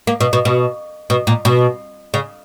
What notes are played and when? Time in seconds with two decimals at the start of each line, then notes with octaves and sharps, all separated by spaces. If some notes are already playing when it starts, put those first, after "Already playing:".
0.07 A#3
0.20 B2
0.33 B2
0.45 B2
1.10 B2
1.27 A#2
1.45 B2
2.14 C#3